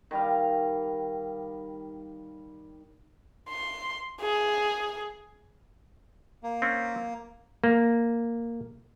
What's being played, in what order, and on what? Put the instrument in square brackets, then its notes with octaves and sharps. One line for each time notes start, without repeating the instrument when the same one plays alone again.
[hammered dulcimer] D#3 G3 F5
[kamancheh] C6
G#4
[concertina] A#3
[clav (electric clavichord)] C4 C#4
A#3